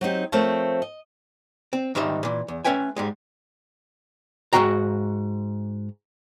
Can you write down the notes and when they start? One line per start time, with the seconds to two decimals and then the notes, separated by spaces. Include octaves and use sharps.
0.01 F#3 C4 D#4 G4
0.32 F3 A3 C4 A#4 C#5 A5
0.82 D#5
1.73 C4
1.95 G#2 D#3 G3 D#4 E5
2.23 A#2 E3
2.48 E2
2.64 A3 C#4 B4 E5 G5 G#5
2.96 G#2 G3 G#3
4.53 G#2 F#3 F#4 G5 A#5